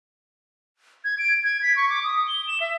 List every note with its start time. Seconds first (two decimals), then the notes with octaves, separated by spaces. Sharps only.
1.04 G#6
1.18 D7
1.44 G#6
1.62 B6
1.76 C#6
1.90 D6
2.04 D#6
2.28 G7
2.48 E7
2.61 E5